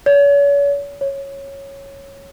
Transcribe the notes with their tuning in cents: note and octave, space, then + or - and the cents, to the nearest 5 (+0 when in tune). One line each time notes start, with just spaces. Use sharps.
C#5 +40
C#5 -10